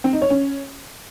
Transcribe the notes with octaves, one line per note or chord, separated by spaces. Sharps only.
C4
D#4
C#5
C#4